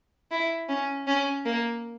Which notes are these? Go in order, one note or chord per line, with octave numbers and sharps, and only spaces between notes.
E4
C#4
C#4
A#3